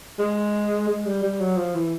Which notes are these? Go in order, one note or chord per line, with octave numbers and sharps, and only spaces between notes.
G#3
G#3
G3
G3
F#3
F3
E3